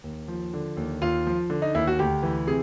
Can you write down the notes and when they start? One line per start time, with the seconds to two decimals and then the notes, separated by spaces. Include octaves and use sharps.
0.04 D#2
0.28 F3
0.53 D3
0.77 D#2
1.01 D#2 F4
1.27 F3
1.50 D3
1.62 D#4
1.74 D#2 E4
1.87 F#4
1.99 D2 G4
2.23 E3
2.47 C3 G#4